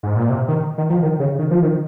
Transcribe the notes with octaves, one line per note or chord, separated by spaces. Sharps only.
G#2
A#2
C3
D#3
D#3
F3
D#3
C#3
D#3
F3
D#3